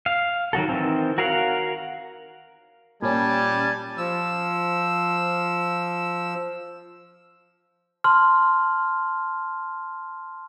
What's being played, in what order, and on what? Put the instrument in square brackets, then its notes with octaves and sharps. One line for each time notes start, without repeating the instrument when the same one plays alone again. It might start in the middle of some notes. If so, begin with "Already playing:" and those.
[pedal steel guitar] F5
D#3 F#3 F#4 A4
D#3 E3 C4
F#4 A#4 C#5 F5 F#5
[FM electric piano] A#2 C#4 [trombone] G3 [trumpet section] G#5 A5
[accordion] F3 E6
[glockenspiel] A5 C6 F6